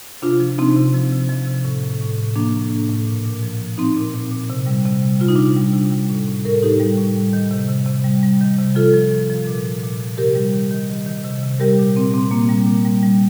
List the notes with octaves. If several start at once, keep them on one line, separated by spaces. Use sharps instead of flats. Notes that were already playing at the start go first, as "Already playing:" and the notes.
C3 D4 F4
F3
C3 C4 D#4
C3
F3
C3
F3
C3
A2
A2
A2
A2
F3 A#3 D4
A2
A2
A2
A#2
A#2
F3
F3
F3 C4 D#4
A#2
A#2
A#2
C3
G3
C3
G3
C3 F4
D#4
C3 D4 F4
G3
C3
G3
A2
A2
A2 A#4
A4
A2 D#4 G4
G3
A2
G3
D#3
C3
C3
C3
G3
G3
D#3
C3
F3 F4 A4
F3
F3
F3
A#2
F3
A#2
F3
C3 G4 A#4
G3
D#3
D#3
D#3
D#3
C3
C3
G3 G4 A#4
A#2
A#2 C4
A#2 C4
A#2 A#3
G3
A#2
G3
G3